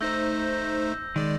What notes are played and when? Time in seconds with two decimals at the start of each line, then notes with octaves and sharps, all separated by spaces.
0.01 A3 D#4 C5 E6 G6 A#6
1.16 D#3 G#3 D5